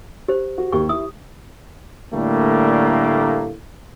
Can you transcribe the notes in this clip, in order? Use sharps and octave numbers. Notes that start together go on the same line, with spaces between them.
G4 C5
F#4
D#2 G4 C#6
E4 D#6
A2 D3 G3 A3 A#3